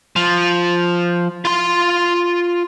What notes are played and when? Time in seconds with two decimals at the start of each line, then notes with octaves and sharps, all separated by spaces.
0.16 F3
1.45 F4 C6